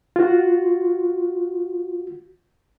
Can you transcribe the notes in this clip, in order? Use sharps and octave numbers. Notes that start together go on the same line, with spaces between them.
F4 F#4